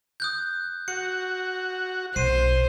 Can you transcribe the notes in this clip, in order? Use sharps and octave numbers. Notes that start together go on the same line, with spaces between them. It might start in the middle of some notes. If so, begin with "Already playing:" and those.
D#6 F#6 G6
F#4 C#7
B1 C5 C7 D#7